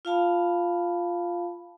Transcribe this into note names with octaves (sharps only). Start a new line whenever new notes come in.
F4 F5 A5 B5